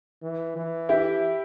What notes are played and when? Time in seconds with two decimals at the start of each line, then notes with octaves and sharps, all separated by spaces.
0.22 E3
0.56 E3
0.89 E4 G4